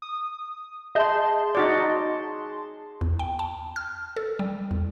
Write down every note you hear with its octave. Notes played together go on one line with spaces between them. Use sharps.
D#6
G#4 D#5 E5 A5 C6 G6
D#4 F#4 D5
E2
G5
A5
F6
A4
G3
E2